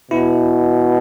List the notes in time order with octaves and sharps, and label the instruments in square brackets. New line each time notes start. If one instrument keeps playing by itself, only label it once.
[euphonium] B2 [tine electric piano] E4